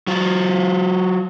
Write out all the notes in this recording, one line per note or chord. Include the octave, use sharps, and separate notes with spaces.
F#3 F4